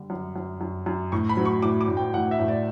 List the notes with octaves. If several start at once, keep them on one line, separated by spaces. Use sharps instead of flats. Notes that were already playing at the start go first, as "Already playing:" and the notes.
Already playing: D3 G3
F#2
F#2
F#2
F#2
A2 C#6
B5
F#3
C#6
A2 D6
D6
A2
G5
A2 F#5
E5
A2
D5